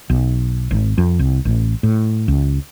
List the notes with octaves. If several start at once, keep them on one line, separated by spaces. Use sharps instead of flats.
B1
G#1
F2
C2
A1
A2
C#2